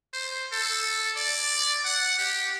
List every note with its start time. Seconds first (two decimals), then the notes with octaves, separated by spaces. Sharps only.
0.13 C5
0.52 A4
1.16 D5
1.85 F#5
2.18 G4